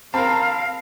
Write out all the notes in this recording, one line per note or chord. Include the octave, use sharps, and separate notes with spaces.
C4 A#4 F5 A5 B5